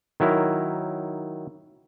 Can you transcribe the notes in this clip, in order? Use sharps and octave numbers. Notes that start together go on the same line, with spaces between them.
D#3 F#3 E4 A#4